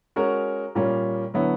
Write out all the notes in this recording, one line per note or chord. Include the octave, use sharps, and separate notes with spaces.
G#3 C#4 F#4 A#4
A#2 G3 A#3 C#4
D3 F#3 B3 E4